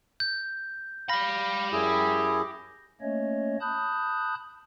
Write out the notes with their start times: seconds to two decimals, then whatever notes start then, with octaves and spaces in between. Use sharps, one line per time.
0.20 G6
1.09 G4 F5 B5 A#6
1.72 F#2 E4 G#4
3.01 A3 A#3 C#4 C#5 D#5
3.61 A5 B5 D#6 F#6 G6